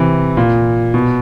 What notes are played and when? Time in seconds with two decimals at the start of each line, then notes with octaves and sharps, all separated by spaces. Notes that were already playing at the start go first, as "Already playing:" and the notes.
Already playing: C3 E3
0.37 A#2
0.94 B2